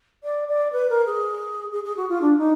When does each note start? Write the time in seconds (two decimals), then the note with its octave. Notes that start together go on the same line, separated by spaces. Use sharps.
0.24 D5
0.48 D5
0.73 B4
0.90 A#4
1.06 G#4
1.72 G#4
1.84 G#4
1.97 F#4
2.09 F4
2.22 D4
2.38 D#4